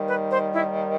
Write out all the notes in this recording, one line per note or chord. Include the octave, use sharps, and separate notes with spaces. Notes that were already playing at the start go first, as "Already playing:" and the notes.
Already playing: D#2 D#3 G3
B4
C5
E4